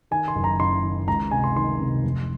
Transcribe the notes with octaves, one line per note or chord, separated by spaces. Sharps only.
D#3 G#5
C6
F#1
A#5
F#1 C6
D#3
C#2 A#5
C3 G#5
C6
D#3 C6
C3
F1